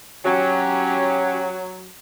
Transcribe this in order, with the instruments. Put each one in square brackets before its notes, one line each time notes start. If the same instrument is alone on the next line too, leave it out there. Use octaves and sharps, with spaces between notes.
[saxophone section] F#3 [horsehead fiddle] C#4 G4